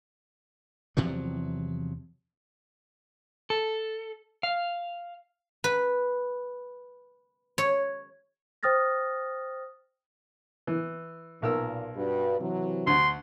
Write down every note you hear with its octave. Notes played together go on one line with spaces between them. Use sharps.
E2 C3 F3 F#3
A4
F5
B4
C#5
C5 G5 D#6 F6 A6 A#6
E3
B1 A#2 A#4 E6
G2 F#4 B4
C3 E3 F#3
D2 C6